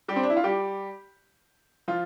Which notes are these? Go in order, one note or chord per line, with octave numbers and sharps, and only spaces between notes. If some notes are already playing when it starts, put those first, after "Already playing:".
G3 G4
C4
D4
E4
F4
G3 G4
F3 F4